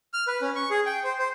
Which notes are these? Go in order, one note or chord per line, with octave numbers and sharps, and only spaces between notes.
F6
B4
C#4
C#6
G#4
G5
C5
C5